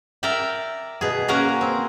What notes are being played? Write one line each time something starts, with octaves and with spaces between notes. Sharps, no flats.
A#4 D5 E5 G5
B2 G#4
A#3 C#4 F#4 A#4 G#5 A#5
C4